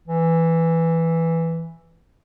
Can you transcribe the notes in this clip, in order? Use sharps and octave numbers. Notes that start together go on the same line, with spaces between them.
E3